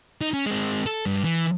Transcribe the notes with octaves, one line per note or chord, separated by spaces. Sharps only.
D#4
C#4
G#3 C4
A4
G2
E3